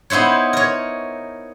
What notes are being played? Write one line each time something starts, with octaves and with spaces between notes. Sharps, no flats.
B3 D#4 E4 C5 C#5
A#4 C#5